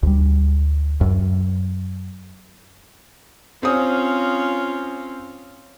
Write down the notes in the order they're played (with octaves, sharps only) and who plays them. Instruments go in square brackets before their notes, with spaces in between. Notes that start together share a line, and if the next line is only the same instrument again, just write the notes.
[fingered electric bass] D2 G3
F#2
[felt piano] C4 D#6 [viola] C#4 F4